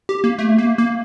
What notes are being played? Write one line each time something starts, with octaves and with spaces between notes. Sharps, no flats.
G4
A#3
A3
A#3
A#3